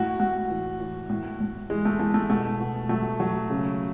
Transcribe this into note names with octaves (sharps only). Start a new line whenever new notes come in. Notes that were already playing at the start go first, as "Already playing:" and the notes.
Already playing: A2 F#4
A2 F#4
E3
E3
A2
A2
E3 G#3
A3
E3 A3
A3
B2 A3
B2
F#3 A3
F#3
C#3